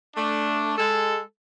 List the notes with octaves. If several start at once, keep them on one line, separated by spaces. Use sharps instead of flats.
A3 D4
G#3 A4